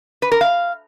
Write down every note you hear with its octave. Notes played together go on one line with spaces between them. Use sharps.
B4
A#4
F5